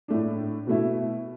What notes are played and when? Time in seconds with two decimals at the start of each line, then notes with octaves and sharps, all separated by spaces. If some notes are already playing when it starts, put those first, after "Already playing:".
0.08 A2 A3 D4
0.67 B2 A3 E4